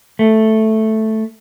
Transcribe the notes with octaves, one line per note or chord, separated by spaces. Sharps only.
A3